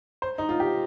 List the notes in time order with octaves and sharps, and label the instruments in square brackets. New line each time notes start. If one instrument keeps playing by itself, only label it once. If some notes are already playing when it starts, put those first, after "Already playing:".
[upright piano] C5
D#4
F4
G4